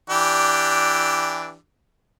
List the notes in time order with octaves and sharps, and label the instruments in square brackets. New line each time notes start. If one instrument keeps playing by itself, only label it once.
[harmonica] E3 D4 G4